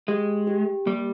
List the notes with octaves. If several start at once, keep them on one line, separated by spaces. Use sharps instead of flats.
G#3 G4
G4
G3 A#3